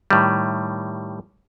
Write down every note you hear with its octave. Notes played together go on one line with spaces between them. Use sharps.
A2 D#3 G3